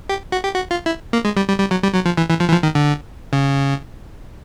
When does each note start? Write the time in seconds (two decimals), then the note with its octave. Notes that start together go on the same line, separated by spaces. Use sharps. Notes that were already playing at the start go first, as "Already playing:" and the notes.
0.09 G4
0.32 F#4
0.44 G4
0.55 F#4
0.71 F4
0.86 E4
1.13 A#3
1.25 G#3
1.37 G3
1.48 G3
1.59 G3
1.71 F#3
1.83 G3
1.94 F#3
2.06 F3
2.17 E3
2.29 E3
2.40 F3
2.48 E3
2.52 F3
2.63 D#3
2.75 D3
3.33 C#3